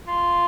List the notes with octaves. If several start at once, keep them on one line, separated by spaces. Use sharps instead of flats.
F4